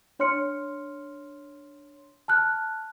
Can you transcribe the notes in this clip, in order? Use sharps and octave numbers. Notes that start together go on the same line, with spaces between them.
D4 C#5 C6 F6 C#7
A5 F6 F#6